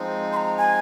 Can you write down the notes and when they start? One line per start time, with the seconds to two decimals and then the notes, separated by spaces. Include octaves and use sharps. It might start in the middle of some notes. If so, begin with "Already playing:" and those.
Already playing: F3 G#3 C4 D#4
0.33 C6
0.37 A#5
0.58 G#5